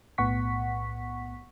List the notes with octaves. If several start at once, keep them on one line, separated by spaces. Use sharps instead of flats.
B1 A2 B3 F#5 C#6 B6